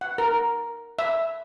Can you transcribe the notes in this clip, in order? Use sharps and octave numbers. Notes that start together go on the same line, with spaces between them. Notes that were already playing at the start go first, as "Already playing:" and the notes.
F#5
A#4
E5